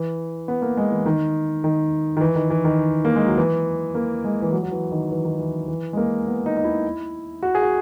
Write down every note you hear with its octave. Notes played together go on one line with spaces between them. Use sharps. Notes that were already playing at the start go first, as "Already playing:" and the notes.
Already playing: E3
B3
A#3
G#3
E3
D#3
D#3
D#3
E3
D#3
E3
D#3
A#3
G#3
F#3
E3
A#3
G#3
E3
F#3
F#3
E3
D#3
E3
D#3
E3
E3
G#3
A#3
B3
D#4
D#4
E4
F#4
G#4
F#4